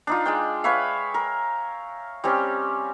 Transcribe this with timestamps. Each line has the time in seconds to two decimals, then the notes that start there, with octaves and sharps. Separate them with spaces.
0.07 D4 D#4 F4
0.25 G#3 D5 G5
0.64 B4 C#5 E5 F5
1.14 A#4
2.24 G3 C4 C#4 G4